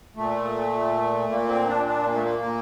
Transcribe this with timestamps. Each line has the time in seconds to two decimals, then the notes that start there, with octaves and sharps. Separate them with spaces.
0.16 A#2 A3
1.30 A#2 A#3
1.48 C4
1.67 D4
1.86 D4
2.06 A#3
2.14 A3
2.23 A#3
2.42 A#2